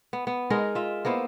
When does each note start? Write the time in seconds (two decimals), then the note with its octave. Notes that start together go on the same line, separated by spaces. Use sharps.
0.13 B3
0.27 B3
0.50 G#3 D#4 A#4
0.75 F4 E5
1.05 A#3 B3 E4 C5